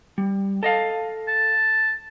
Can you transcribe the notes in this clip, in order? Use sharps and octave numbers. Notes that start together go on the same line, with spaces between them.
G3
A4 D#5 F5
A5